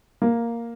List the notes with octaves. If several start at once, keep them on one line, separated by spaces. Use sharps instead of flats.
A#3